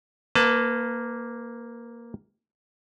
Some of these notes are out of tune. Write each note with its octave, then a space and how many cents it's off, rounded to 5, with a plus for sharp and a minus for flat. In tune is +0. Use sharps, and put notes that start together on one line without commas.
A#3 +0 B4 +30 A5 +10